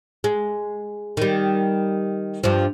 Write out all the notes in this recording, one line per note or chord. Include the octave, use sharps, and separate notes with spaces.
G#3
D#3 G3
G2 F3